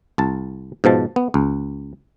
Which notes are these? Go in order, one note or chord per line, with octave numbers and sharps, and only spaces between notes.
C2 A5
G#2 B2 F3 A5
B3
C#2